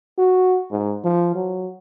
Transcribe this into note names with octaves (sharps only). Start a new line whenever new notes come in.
F#4
G#2
F3
F#3